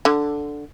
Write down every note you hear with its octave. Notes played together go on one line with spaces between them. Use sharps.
D3